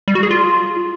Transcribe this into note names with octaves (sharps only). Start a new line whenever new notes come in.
G3
F#4
G#4
F4